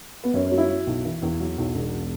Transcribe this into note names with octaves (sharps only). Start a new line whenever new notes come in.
B3
F#2 C#4
C#4
F#3
E4
F#3
B1
E3
E2
F#3 F#4
B1
E1